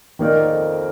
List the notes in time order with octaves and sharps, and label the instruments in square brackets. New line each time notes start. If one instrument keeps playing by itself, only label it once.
[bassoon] G2 [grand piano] D#3 A#3 D#4 A#4 D5
[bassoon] A#2
G#2
F2